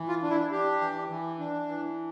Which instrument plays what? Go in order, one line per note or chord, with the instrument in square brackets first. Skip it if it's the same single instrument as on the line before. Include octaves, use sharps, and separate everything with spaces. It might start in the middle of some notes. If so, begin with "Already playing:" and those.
Already playing: [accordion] E3
F4
D4
E4
D4 G4
E3
E3
D4
E3